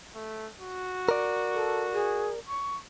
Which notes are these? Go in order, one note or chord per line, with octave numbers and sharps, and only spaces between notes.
A3
F#4
A#4 D5
A4
G#4
C#6